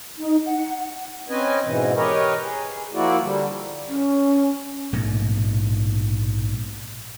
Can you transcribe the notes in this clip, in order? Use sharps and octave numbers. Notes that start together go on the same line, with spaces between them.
D#4
F#5
C4 C#4 B4 D#5 G#5
G#2 B2 E3
G4 A#4 B4 C#5 D#5
G#4
F3 A#3 E4 F#4 D5
D3 G3
C#4
A#1 G#2 B2 A3